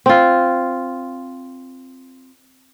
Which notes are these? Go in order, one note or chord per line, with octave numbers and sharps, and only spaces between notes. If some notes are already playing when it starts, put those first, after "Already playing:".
C4 F4